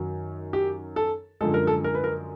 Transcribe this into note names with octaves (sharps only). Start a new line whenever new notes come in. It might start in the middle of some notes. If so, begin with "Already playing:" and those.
Already playing: F#2 D#3 F#3
G4
A4
F#2 D3 F3 G#3 A4
A#4
A4
A#4
B4
A#4